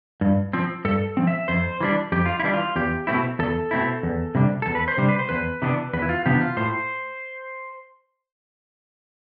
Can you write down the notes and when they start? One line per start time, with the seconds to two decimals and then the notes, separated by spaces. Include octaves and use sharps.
0.21 G2
0.53 F3 C4
0.85 G2 A4
1.17 F3 C4
1.27 E5
1.48 F2 C5
1.80 E3 G3 D4
2.12 F2 G4
2.26 F4
2.40 E4
2.44 E3 G3 D4
2.54 F4
2.76 E2 G4
3.07 B2 A3 C4 E4
3.39 E2 A4
3.71 B2 A3 C4 E4
4.03 E2
4.35 C3 G3 D4
4.62 E2 A4
4.75 B4
4.88 C5
4.98 C3 G3 D4
5.09 B4
5.19 C5
5.29 E2 B4
5.62 C3 E3 B3 D4
5.93 E2 B4
6.02 E4
6.09 F4
6.26 C3 E3 B3 D4 G4
6.41 F4
6.57 A2 C5